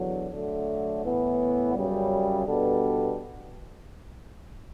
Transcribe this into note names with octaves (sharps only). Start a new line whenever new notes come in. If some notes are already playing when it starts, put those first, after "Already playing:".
Already playing: E2 D3 F#3
D3 F#3 A3
A2 E3 B3
F#2 C#3 G3
B2 G3 B3 D4 A4